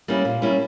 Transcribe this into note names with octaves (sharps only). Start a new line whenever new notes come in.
G3 A#3 C#4 E4
A#2
G3 A#3 C#4 E4